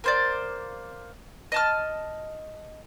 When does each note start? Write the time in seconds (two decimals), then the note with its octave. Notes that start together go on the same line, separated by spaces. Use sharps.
0.04 A#3 C5 D5
1.52 D#5 A5 F6